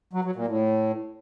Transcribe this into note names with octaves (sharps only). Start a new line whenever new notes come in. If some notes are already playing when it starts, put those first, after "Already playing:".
F#3
F#3
A#2
A2